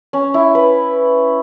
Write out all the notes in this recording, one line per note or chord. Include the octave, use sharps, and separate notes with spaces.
C#4
E4
B4